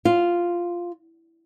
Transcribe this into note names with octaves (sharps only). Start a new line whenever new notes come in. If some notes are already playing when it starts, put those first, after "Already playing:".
F4